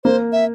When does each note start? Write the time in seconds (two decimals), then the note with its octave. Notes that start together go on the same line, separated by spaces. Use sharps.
0.04 A#3 C5
0.32 E5